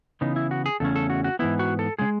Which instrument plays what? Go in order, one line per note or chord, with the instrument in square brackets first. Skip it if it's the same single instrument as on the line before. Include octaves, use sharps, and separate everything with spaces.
[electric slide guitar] C#3 E3 B3 D#4
E4
F#4
G#4
E2 C#3 A3 C#4 A4
A4
F#4
F#4
G#2 E3 B3 E4
F#4
A4
C#3 G#3 G#4